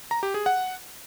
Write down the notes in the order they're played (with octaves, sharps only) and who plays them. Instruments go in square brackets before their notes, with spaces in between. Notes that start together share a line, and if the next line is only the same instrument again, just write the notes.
[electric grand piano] A#5
G4
G#4
F#5